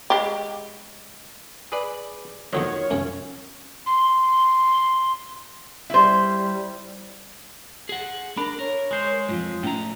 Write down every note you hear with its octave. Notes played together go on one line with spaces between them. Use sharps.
G#3 G4
G#4 B4 D5
D#2 D3 D#3 F3 F#3 C#4 C#5
C2 F#2 C#4 C#5
C6
G3 E4 C5
G#4 F#5
D4 A#4 B5
A#4 C#5
G#3 C5
F2 G#2 F4
A2 C#4 A#5